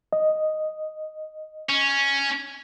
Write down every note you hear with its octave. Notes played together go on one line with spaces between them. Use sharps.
D#5
C#4